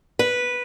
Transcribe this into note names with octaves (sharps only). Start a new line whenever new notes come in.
B4